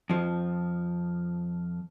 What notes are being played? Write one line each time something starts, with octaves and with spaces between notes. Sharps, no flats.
F2 F3